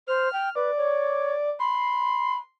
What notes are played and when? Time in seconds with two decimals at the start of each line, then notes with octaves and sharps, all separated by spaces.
0.07 C5 F6
0.33 G5
0.55 B4 D5
0.77 C#5
1.59 B5 C6